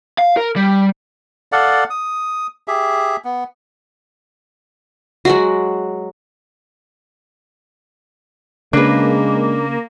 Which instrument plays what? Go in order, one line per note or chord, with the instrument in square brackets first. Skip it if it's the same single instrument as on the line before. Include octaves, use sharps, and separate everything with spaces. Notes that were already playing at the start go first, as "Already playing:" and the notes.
[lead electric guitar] F5
A#4
G3
[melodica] A4 D5 F5 F#5
D#6
G4 G#4 E5
B3
[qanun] F#3 G#3 F#4
[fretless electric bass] C#3 [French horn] G#3 [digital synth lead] A#3 [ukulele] D4 B4